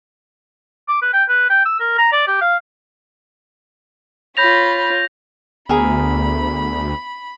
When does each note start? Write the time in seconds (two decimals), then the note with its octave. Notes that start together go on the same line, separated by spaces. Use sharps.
0.88 D6
1.02 B4
1.13 G5
1.29 B4
1.50 G5
1.65 E6
1.80 A#4
1.98 A#5
2.13 D5
2.27 G4
2.41 F5
4.37 F4 C#5 B5 G6 A#6 F7
5.69 D2 B3 G#4 A#4 B5